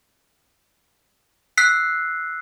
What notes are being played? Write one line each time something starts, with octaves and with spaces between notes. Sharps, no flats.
E6 F#6 B6 C7